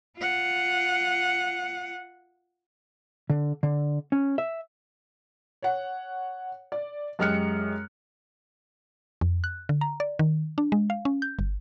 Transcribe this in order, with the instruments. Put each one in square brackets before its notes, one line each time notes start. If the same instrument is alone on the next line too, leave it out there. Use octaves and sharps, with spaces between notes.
[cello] F4 F#5
[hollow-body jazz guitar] D3
D3
C#4
E5
[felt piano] C#5 F#5
D5
F#2 G#3 G4 F6 F#6 C#7
[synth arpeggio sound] F2
F#6
D3
A#5
D5
D#3
D4
G#3
F5
C#4
G6
G1